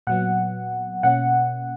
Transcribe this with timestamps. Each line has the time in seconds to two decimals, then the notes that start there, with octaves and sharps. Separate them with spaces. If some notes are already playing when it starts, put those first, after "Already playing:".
0.07 A#2 F#3 B3 F#5
1.03 B2 A#3 C#4 F#5